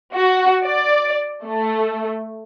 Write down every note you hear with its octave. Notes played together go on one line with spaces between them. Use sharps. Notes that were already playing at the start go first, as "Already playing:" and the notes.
F#4
D5
A3